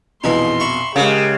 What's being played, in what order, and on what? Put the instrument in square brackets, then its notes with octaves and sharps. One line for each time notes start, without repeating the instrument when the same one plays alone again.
[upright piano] A#1 F2 B2 [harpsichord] E3 G#3 D#4 [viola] C6
[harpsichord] E5 B5 C#6
[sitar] C#3 [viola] G#3 G4 [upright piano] A#4